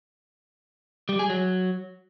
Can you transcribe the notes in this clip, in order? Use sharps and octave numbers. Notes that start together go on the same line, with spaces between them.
G3
G#4
F#3